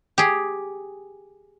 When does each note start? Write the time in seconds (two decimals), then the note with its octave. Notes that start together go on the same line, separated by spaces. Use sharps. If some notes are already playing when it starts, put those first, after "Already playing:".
0.18 G4 G#4